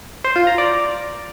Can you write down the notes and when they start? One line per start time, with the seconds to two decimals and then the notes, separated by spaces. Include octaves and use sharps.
0.24 C5
0.36 F4
0.47 A#5
0.58 D5